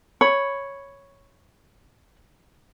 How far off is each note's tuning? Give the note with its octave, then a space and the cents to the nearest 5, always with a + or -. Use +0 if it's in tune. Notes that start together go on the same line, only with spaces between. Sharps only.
C#5 +0 B5 +0